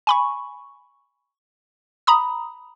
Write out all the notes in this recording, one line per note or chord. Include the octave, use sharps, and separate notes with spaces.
G#5 B5 C#6
A#5 B5 D#6